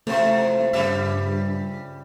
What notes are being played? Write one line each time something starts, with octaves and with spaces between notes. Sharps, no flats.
E2 C3 F3 A3 C5
G2 C#3 G3 E5